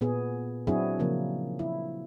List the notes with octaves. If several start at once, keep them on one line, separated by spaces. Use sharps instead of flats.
A#2 B3 G#4
F#3 C4 D4 E4 F#4 G#4
C#3 F3 A#3
E4